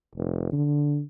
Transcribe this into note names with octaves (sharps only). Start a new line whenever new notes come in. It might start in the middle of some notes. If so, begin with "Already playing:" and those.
F1
D3